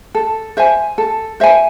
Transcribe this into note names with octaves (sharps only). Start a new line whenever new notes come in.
A4
C5 E5 G#5
A4
C5 E5 G#5